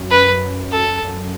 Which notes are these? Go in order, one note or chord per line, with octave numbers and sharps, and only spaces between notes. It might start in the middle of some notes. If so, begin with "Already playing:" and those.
Already playing: F#2
B4
A4
F#2